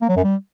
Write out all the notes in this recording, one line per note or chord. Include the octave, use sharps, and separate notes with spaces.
A#3
F#3
F#2
G3